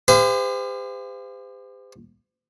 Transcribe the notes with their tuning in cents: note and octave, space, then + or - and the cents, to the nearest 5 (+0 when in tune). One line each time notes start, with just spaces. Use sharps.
G4 +40 C5 -40 F5 -20